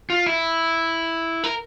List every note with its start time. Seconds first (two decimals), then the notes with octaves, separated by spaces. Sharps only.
0.10 F4
0.27 E4
1.44 A#4